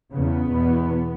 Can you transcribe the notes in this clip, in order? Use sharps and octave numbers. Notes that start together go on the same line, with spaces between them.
E2 C#3 B3
E2 B2